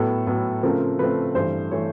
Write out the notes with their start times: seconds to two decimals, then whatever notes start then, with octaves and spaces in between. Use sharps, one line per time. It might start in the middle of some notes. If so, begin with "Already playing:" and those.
Already playing: A2 F#3 B3 A4
0.27 A2 F#3 B3
0.63 C#3 F3 A3 C4 A#4
0.99 C#3 F3 A3 C4 B4
1.35 G2 E3 A3 C5
1.71 E3 A3 C#5